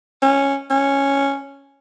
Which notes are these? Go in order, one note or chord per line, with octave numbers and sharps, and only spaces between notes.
C#4
C#4